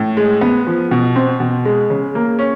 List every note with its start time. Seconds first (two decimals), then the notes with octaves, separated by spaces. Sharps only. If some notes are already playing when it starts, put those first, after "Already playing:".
Already playing: A2
0.17 G#3
0.41 B3
0.67 F3
0.91 B2
1.16 C4
1.40 B2
1.65 G#3
1.90 C#3
2.15 A#3
2.39 C#4